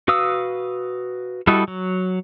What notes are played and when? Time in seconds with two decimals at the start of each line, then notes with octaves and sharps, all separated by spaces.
0.08 F#4 B4 F5 D#6 E6
1.47 G3 E4 F#4 A4 D#5
1.68 F#3